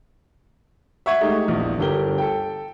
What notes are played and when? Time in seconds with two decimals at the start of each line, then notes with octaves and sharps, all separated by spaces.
1.06 E5 F#5 C#6 G#6
1.21 G#3 A3 D#4 G4
1.48 A#1 E2
1.78 G1 D3 G4 A#4 G7
2.18 A4 G5